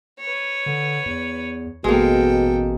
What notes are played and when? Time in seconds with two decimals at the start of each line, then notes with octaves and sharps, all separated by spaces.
0.20 B4 C#5
0.66 D3
1.06 E2
1.84 A1 B2 G#3 A#3 A4 G5